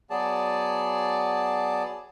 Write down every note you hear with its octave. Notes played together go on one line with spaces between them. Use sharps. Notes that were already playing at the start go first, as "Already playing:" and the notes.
F#3 B3 G#4 D5 A5